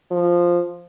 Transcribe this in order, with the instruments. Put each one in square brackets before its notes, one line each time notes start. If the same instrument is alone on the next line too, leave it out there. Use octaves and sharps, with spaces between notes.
[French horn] F3